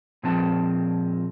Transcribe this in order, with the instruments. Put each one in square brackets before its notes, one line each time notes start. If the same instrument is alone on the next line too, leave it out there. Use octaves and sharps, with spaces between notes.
[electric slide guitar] A#2 F3 G#3 C4 A5